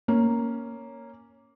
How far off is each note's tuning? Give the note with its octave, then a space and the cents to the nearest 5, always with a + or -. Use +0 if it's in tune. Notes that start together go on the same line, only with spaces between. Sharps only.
A#3 +0 C#4 +0